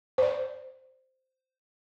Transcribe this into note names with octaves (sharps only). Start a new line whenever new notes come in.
C5 D5